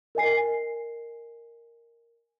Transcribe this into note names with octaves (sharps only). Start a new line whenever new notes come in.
A#4 D#5 G#5 C7